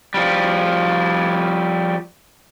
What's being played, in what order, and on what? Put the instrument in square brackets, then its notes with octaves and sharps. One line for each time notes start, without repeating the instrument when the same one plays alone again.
[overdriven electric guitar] F3 G3